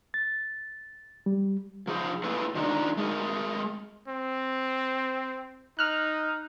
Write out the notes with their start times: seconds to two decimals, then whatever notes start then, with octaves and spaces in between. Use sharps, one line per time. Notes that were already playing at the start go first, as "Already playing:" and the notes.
0.14 A6
1.26 G3
1.87 F3 G#4 C5
2.24 A3 A#3 E4 G#4 A4 B4
2.55 D#3 F3 G#3 D4 D#4
2.97 G#3 A3 G#4 A#4
4.08 C4
5.79 D#4 F6 F#6